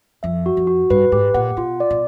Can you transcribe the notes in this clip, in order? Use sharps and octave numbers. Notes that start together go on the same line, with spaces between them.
F2 E5
F#4
F2
F#4
G2 B4
G#2 G4
A#2 F#5
B2 F4
D5
B2